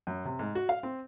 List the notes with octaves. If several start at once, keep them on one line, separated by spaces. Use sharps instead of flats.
F#2
C3
G#2
F#4
F5
C4